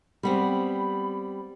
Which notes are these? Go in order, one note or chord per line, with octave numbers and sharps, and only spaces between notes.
G3 B3 C4 B5